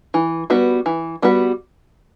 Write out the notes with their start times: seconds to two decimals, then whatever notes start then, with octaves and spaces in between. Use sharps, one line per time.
0.14 E3
0.50 G3 B3 F#4 B4
0.86 E3
1.22 G3 B3 F#4 B4